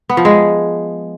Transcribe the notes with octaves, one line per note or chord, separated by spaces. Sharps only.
B3
F3
G#3